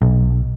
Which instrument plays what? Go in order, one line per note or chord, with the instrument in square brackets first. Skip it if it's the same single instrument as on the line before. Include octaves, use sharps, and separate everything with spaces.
[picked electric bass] B1